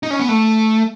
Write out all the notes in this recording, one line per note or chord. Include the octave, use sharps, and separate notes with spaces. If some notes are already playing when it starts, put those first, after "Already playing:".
D#4
C#4
B3
A3